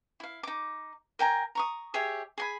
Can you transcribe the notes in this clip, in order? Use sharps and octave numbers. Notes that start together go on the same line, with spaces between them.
E4 F5
D#4 D6
A#4 G5 G#5 A#5
A#5 C#6 D#6
G4 G#4 C#5 E5
G#4 G#5 B5